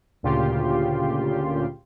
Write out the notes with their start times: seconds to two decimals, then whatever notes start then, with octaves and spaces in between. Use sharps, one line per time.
0.23 D2 A#2 C#3 F4 G4 C6